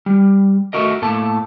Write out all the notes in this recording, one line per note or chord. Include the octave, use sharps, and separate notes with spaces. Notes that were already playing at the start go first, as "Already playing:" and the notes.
G3
A3 F#4 A#4 D#5
A2 A#3 A4 A5